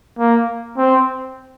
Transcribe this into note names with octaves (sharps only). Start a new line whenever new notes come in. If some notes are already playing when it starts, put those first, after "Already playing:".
A#3
C4